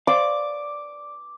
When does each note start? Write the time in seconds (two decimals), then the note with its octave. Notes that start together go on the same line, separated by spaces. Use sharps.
0.07 C5 D5 F5 D6